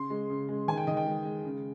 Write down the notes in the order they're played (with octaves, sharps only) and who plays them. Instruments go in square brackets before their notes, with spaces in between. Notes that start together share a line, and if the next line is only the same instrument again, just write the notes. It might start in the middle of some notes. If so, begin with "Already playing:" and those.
Already playing: [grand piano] C#3 C6
G#3
C#3
G#3
D#3 G#5
G5
D#3 D#5
G5
G#3
G#3
C#3